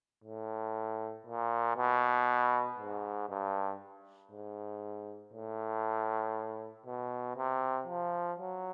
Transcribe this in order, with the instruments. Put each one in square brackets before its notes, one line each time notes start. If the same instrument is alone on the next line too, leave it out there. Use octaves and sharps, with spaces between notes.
[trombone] A2
A#2
B2
G#2
G2
G#2
A2
B2
C3
F3
F#3